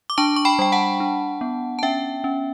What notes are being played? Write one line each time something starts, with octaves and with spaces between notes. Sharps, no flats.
D6
D4 A5 C#6
C#6
G5 B5
G3 G5
F#5 A5
D4
B3
A5
C#4 E5 G5
C#4